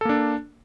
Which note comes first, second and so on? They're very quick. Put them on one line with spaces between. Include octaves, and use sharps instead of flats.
A4 A#3 D4